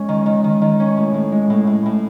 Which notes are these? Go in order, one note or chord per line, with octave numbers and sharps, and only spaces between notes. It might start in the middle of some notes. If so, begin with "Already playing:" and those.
Already playing: G#3 C#4
D#3
D#3
D#3
D#3
C#4
A2
A2
G#3
A2
A2
A2